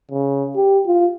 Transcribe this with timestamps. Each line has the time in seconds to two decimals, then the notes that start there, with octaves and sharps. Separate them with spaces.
0.11 C#3
0.56 G4
0.87 F4